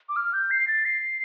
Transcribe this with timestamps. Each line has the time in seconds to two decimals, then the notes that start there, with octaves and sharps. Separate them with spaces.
0.09 D6
0.16 F6
0.33 G6
0.51 C7
0.68 A6
0.85 C7